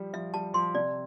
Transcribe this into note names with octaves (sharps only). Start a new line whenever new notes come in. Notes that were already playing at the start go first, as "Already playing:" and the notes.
Already playing: F3 G3
F3 E5
G3 A5
F3 C6
C3 D5